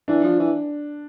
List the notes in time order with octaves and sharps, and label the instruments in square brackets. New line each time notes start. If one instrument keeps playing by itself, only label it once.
[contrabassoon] E3 [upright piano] D4
[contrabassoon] F3
E3